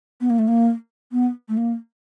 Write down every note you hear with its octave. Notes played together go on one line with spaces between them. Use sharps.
B3
A#3
A3
A#3
B3
A3
A#3